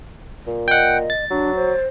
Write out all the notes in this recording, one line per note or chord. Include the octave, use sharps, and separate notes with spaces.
A#2
D#5 F#5 G5
A6
F#3 D4
C5